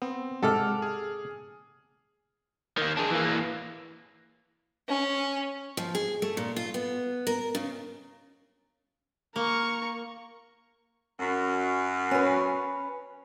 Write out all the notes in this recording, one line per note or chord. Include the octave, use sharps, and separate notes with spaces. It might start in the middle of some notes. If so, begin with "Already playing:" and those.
B3 C4
G#2 C3 G#3 A4 F#5 D6 F6
G#4
D#3 A#3
D4 G#4
E3 A#3
C#4
F3
G#4
A3
A#2
F4
B3
A#4
C#3
A#3 A#4 C#6
F#2
C#4 B4